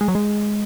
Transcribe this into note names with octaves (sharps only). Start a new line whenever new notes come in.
G#3
F#3
G#3